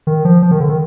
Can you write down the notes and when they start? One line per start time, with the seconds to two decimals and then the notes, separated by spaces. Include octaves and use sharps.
0.07 D#3
0.25 F3
0.42 F3
0.51 D#3
0.60 D3
0.69 D#3